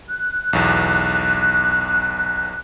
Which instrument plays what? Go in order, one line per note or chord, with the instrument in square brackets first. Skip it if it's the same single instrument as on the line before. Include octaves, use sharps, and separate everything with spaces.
[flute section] F#6
[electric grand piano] B1 E2